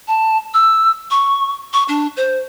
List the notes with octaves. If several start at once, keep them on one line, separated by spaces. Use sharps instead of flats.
A5
E6
C#6
C#6
D4
C5